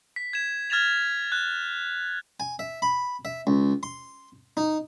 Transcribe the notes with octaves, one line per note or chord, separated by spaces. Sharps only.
B6
G#6 E7
F6 G#6 A6 E7 F7
F#6
G#5
E5
B5
E5
C#2
C6
D#4